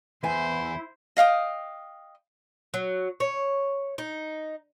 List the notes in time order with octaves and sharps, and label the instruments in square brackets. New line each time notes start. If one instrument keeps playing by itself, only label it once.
[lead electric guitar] E2 [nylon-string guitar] B3 G#5 [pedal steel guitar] E4 [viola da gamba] C5
[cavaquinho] D#5 F5 G5 D#6
[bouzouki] F#3
C#5
D#4